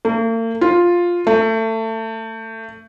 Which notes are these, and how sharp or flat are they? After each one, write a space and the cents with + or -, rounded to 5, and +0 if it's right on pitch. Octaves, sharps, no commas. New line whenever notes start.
A#3 -45
F4 +5
A3 +25